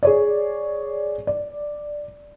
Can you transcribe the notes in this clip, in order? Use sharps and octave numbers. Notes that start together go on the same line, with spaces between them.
G#4 C#5 D5
D5